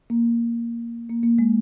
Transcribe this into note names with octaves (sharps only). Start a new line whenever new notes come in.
A#3
A#3
A#3
G#3